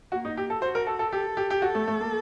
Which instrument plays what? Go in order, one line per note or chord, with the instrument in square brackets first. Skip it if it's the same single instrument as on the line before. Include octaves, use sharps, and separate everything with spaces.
[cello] A#3 [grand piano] F#4
[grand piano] D#4
G4
A4
[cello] F#4 [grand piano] C5
[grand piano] A#4
A4
A4
[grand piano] G4 [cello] A4
[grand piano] G4
G4
[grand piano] F#4 [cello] A4
[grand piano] A3
A3
A#3